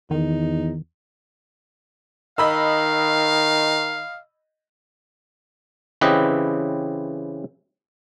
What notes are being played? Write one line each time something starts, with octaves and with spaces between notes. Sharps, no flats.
E2 D#3 D#4
D#3 D#5 F5 B5 E6
C#3 E3 C4 G4 B4 D#5